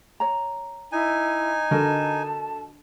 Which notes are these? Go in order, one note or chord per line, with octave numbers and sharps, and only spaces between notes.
C#5 A#5
D#4 E4 G#5
D3 F#4 A#4 D#5 A5